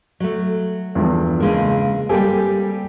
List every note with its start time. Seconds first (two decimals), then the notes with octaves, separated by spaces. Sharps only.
0.20 F#3 A3
0.95 E2 G2 F3
1.40 C#3 G#3 A#3
2.09 G3 A#3 C4 G4 A4 G#5